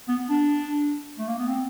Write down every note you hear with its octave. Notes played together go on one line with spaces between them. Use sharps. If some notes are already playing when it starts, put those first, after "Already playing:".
B3
D4
A3
A#3
B3
C4